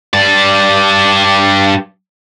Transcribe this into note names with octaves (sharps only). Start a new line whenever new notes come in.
G2 D5